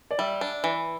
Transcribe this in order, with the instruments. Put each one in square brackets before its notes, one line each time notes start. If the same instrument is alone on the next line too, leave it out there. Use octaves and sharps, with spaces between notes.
[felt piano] D5
[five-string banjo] G3 [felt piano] E5
[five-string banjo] D4
E3